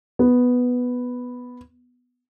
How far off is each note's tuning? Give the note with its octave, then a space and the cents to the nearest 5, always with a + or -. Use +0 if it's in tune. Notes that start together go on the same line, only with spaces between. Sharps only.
B3 +0